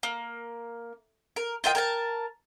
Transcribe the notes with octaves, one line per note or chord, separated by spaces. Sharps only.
A#3
A#4
F4 A#4 D#5 G5
A#4 G#5 A5